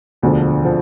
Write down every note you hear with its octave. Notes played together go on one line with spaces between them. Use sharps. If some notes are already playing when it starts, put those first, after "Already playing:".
E1 D2 D3 F3
D3 F3